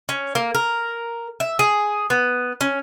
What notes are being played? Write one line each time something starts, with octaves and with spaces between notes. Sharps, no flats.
C#4
A#3
A#4
E5
G#4
B3
C#4